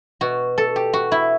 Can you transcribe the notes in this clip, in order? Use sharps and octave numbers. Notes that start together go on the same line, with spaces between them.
B2 F#4
A4
G4
F#4
E4